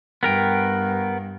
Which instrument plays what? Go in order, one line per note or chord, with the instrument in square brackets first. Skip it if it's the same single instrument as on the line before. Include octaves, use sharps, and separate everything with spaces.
[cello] G2 [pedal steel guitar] B3 A#4 G5